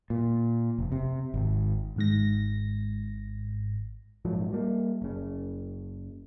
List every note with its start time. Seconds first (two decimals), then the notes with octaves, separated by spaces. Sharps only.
0.10 A#2
0.78 F1
0.92 C3
1.34 G#1
1.96 G#1 G#2 A#6
4.25 A#1 G#2 F3 F#3
4.53 G3 A#3
5.02 F#1 C#3